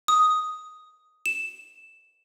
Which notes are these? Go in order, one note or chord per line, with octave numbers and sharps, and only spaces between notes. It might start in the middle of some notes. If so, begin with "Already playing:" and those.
D#6
E7